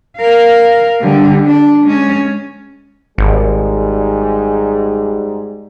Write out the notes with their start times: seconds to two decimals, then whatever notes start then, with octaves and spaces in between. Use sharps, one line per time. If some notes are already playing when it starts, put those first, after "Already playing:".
0.18 A#4 F5
1.01 D3 G3
1.45 D4
1.84 G#3 C#4
3.18 G#1 G#2 G3 G#4